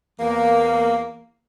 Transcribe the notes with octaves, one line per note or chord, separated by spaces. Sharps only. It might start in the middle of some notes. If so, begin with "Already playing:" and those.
E2 A#3